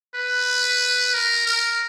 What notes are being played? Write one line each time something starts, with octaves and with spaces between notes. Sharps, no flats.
B4
A#4
A#4